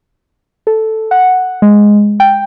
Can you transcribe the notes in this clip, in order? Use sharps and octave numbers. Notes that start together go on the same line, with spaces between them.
A4
F#5
G#3
G5